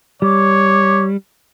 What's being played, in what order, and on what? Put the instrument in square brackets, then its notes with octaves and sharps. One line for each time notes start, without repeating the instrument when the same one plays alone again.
[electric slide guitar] G3 [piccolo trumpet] C#5 [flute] D6